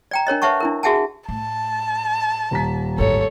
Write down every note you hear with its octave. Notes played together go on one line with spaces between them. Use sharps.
D5 G5 A#5
D4 A#4 C#5 D#5
B4 C#5 E5 F#5 A5 C#6
D4 E4 A#4
F#4 G#4 E5 F#5 G#5 A5
A2 A5
D#1 A#5 B6
A1 G#2 A4 C#5